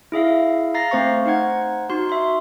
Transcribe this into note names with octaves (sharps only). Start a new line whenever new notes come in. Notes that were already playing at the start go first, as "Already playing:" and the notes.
E4 G#4 E5 F5
F5 A#5 A6 A#6 C7
A3 C4 C5 F5 C#6
D#4 C5 F#5 G#6
D#4 F#4 C6
E5 C6